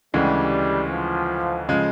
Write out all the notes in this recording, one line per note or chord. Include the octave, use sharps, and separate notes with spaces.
D2 C#3 E3 G3 G#3
F3
C#3 F3 G#3